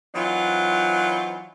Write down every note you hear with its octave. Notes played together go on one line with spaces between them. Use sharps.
E3 F#3 C4 D#4 F4